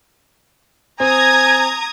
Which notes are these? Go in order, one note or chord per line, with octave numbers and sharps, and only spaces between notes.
C4 G#5 A#5 D#6 G#6